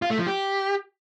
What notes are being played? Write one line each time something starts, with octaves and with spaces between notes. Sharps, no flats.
F4
A3
F3
G4